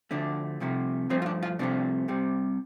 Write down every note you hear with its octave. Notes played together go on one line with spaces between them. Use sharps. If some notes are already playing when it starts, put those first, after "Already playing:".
D2 D3 F3 A3 D4
C2 C3 F3 A3
G2 F3 A3 C4
F4
D4
F4
C2 C3 F3 A3 D4
C2 C3 G3